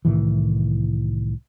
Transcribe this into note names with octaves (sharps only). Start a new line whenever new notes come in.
C2 A2 D#3 E3